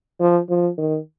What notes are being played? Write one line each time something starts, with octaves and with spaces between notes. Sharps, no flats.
F3
F3
D#3